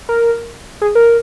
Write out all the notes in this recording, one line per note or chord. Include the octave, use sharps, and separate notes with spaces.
A#4
G#4
A#4